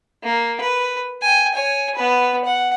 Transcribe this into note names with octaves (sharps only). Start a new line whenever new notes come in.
A#3
B4
G5 G#5
C#5 G#5
B3 B4
F#5